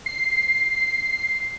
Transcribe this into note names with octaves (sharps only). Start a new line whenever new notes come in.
C7